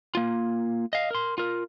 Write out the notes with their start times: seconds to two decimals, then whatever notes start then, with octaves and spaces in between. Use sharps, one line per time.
0.15 A#3 F4
0.93 D#5 F5
1.11 A#4 C6
1.38 F4 A#4